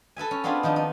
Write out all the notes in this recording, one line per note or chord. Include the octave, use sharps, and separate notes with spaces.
A4 B4 E5 G#5
C#4
B3 C4 D4 F4 G#4 B4
D#3 F3 D4 D#4
D#4